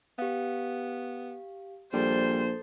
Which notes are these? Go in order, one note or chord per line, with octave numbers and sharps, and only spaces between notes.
B3 G4 F5
A#1 G3 A4 C5 A6